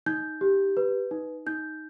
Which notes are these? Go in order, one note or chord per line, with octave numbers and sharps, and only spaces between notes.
D#4 G6
G4
B4
D#4
D#4 G6